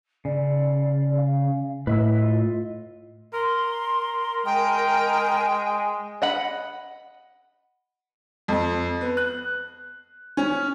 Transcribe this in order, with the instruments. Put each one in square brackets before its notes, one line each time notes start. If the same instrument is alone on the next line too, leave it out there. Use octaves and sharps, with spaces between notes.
[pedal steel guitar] C#3 [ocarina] D5
[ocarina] F5
[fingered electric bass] A2 [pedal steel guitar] B4 E5 E6 [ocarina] D#5
[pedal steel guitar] F4
[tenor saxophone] A#4 [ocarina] C6
[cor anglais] G#3 [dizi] G5 [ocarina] G#5
[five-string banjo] D#5 F#5 B5
[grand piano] F2
B3
F#6
C#4